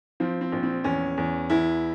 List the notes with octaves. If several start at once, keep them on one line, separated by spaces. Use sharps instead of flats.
F3 C4
C4
A#1
C4
E2 C#4
E2
E2 E4